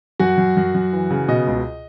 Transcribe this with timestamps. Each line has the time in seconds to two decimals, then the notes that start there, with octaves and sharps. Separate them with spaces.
0.19 F#2 F#4 F#5
0.38 F#2
0.57 F#2
0.75 F#2
0.93 E3
1.11 C#3
1.28 B2 D#5
1.47 C#2